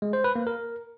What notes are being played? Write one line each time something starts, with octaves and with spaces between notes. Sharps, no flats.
G#3
C5
B4
A#3
A#4